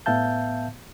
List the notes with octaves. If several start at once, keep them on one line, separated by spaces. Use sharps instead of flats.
A2 B3 E5 F5 A5 G6